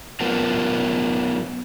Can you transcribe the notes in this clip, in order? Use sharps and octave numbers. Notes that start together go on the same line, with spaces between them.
F#3 B3 F4 A#4 B4 A5